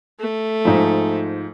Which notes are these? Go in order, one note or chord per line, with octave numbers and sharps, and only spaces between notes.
A3
G#2 F3